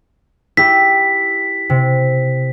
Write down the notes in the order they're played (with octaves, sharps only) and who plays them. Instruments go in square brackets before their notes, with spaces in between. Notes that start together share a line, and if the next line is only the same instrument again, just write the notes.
[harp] E4 G4 [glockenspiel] B6
[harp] C3